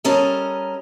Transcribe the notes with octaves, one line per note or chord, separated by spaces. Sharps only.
G3 C#4 A4 A#4 D#5